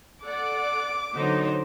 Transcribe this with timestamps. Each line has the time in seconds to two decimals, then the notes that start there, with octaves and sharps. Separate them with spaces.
0.23 A4 D5 F#5 D6
1.13 D3 F#3 B3 D#4 C5 D#5